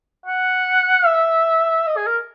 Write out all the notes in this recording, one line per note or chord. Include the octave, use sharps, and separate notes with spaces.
F#5
E5
D#5
G#4
A#4